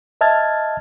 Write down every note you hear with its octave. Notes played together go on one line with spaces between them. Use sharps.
D#5 E5 A5 F6 G#6 A6